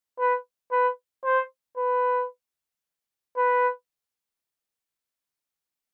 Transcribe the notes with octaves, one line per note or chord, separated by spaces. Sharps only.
B4
B4
C5
B4
B4